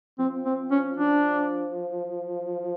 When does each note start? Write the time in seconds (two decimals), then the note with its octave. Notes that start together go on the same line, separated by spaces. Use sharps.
0.19 F3 C4
0.45 C4
0.71 C#4
0.96 F3 D4